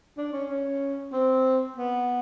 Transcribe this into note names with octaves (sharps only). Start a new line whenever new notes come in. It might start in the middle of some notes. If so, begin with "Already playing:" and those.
D4
C#4
C#4
C4
B3